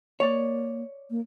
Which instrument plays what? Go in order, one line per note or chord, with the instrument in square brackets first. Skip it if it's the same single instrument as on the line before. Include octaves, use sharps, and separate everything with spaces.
[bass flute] A#3 [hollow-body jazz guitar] C#5 D5
[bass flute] A#3